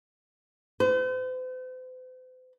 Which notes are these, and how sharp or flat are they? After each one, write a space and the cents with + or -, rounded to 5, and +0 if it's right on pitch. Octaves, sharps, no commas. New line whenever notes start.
C5 -45